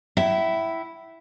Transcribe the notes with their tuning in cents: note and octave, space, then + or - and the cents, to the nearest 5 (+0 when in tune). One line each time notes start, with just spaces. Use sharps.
E4 +0 E5 +0 G5 -45